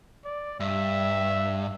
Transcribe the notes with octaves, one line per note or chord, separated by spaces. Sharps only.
D5
G2 E5